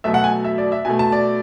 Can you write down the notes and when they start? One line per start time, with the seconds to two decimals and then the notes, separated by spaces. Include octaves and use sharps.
0.04 B2 F#3 A3 E5
0.14 F#5
0.24 G#5
0.44 E5
0.58 D5
0.72 E5
0.85 B2 A3 G#5
0.99 A5
1.12 D5